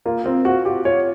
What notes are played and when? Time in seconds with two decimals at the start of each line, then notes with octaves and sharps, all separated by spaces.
0.06 A#3 F4
0.25 C4 F4
0.45 F4 F#4
0.65 F4 G4
0.85 F4 C#5